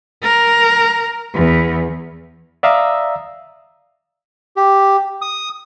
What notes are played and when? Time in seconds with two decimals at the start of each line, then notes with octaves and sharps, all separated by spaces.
0.23 A#4
1.34 E2
2.63 D5 E5 F5 A#5 D#6 E6
4.56 G4
5.22 D#6